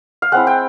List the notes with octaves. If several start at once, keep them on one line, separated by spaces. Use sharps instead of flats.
F5
G#3 C4 E4 F#5
G5